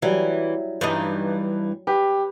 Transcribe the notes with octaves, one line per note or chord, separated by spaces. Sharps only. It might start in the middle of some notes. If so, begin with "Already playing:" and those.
E3 F#3 G3
G2 E3 D#4
G4 B4